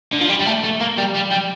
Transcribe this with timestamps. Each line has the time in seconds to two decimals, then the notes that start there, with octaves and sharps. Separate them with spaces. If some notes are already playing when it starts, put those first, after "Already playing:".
0.12 D3
0.21 F3
0.29 G3
0.40 G3
0.46 A3
0.64 A3
0.80 A#3
0.97 G3
1.15 G3
1.31 G3